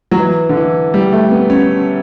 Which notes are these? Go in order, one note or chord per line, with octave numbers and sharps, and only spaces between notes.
F#3
E3
D3
E3
G3
A3
B3
C#4